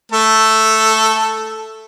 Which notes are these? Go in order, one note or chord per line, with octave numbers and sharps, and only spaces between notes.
A3 A4